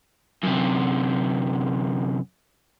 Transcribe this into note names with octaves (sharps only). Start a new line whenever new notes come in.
F#2 C3